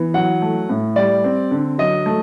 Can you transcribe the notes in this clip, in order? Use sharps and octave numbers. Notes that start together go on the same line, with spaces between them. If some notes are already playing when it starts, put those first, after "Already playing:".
Already playing: E3 B3
F#3 F#5
A3
A2
G3 D5
C4
D3
F#3 D#5
A3